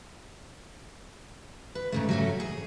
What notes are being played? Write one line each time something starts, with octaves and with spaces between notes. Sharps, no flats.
B4
G#2 C#3 A3
F#3 A3 C#4
G#4